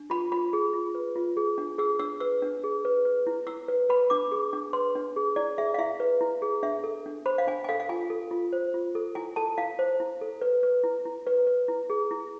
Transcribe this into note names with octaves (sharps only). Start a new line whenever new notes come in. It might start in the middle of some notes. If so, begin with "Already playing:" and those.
Already playing: D4
F4 B5
F4 B5
G#4
F4
B4
F4
G#4
D4
G#4 E6
D4 E6
B4 E6
D4
G#4
B4
B4
E4
E4 E6
B4
B4 B5
D4 D6
G#4
D4
B4 C6
D4
G#4
E4 D5
G#4 E5
F5
E4 E5
B4
E4
G#4
D4 E5
A4
D4
C5 B5
F5
D4 G#5
G#5
A4 F5
F5
F4 G#5
A4
F4
C5
F4
A4
E4 G#5
A4 A5
E4 F5
C5
E4
A4
B4
B4
E4
E4
B4
B4
E4
G#4
E4